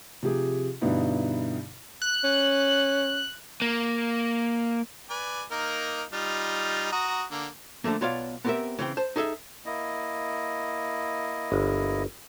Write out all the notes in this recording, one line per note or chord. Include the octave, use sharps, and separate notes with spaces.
C3 F3 G4 G#4
G2 B2 D3 B3 D#4 E4
F#6
C#4
A#3
B4 D5 G#5
A#3 D#4 A#4
G3 D#4 F4
F#4 A#5 D#6
D3 A#3
D3 F3 A3 A#3
B1 B3 F4 C#5 D5 F5
B3 C4 G4 G#4 A#4 E5
C#3 E3 C4 G5
C5 A5
D#4 G#4 A4 E5
A#3 E4 D#5
G1